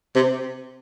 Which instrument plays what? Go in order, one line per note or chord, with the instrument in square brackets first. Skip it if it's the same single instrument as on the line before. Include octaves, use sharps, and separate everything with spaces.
[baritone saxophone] C3